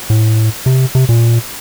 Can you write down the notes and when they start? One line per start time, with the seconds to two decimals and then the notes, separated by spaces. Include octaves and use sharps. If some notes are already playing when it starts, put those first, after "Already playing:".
0.10 A2
0.66 C3
0.95 C3
1.09 A#2